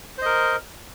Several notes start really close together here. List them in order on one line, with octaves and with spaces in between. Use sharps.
C5 D#5 A#4